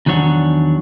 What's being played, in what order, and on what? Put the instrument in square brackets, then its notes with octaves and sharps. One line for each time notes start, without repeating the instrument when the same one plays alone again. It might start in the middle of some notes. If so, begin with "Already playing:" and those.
[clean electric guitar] E2 D#3 F#3 D4 C#5 F#5